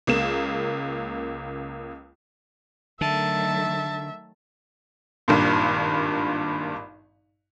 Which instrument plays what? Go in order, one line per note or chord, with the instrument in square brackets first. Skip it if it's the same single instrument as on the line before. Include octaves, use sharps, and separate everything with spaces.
[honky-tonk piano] C#2 A#3 E7
[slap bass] D3 [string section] D#3 F#3 A3 [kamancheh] E5 [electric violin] A5
[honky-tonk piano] G#1 G2 A#2